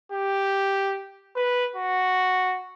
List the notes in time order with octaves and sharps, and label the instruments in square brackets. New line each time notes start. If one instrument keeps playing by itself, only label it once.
[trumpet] G4
B4
F#4